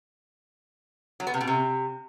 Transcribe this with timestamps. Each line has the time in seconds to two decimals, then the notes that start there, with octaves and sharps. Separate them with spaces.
1.20 F#3
1.27 B3
1.34 C3
1.41 B2
1.47 C3